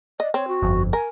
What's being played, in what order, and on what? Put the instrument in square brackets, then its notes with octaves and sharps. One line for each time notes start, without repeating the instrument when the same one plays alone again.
[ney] D5 [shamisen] D#5
[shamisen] C4 [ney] C#5
[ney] F#4
[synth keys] G1 F2
[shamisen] A#4 [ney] G#5